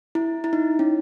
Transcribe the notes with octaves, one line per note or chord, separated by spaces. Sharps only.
E4
E4
D#4
C#4